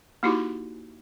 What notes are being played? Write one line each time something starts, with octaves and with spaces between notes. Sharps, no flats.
A#3 D#4 E4 F#4 G4